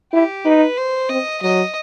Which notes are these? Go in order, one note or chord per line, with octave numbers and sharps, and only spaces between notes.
E4 G4
D#4 B4
C5
C4 D#5
F#3 D#5